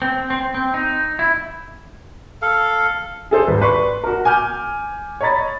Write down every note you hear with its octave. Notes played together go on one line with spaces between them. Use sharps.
C4
C4
C4
D#4
E4
A4 F5
G#4 A4 C5
G#1 B4
B4 D5 C6 C#6
F#4 A#4
G#5 D6 F6 G6
C#5 D#5 A#5 B5 A6